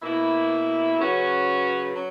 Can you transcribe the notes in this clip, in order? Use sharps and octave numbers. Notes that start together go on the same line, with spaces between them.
B2 A#3 E4
C#3 F#3 C#4 F#4 B4
F#3 C#4